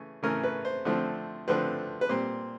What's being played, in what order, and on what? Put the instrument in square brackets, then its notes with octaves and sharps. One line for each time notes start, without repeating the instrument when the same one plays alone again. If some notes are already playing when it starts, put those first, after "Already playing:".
Already playing: [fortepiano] C#3 E3 A3 C#4
C#3 E3 A3 C#4 A#4
B4
C5
D3 F3 A3 C4
D3 F3 A3 C4 B4
B4
A#2 G3 C4 C5